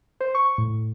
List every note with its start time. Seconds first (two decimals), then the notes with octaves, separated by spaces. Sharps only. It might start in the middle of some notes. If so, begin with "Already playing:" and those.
0.20 C5
0.35 C#6
0.58 A2